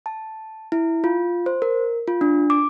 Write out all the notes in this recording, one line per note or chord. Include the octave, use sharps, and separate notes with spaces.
A5
E4
F4
C5
A#4
F4
D4
D6